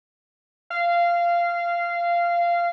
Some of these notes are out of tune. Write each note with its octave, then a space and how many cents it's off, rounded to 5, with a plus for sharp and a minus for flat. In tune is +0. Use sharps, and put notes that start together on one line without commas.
F5 -15